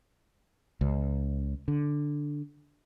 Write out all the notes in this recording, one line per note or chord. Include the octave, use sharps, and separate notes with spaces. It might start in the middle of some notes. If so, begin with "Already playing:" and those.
C#2
D3